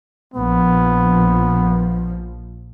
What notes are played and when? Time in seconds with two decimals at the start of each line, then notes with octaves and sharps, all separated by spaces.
0.34 A#1 F3 B3